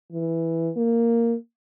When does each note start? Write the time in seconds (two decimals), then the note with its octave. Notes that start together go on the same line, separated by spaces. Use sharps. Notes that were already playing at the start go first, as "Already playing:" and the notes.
0.12 E3
0.76 A#3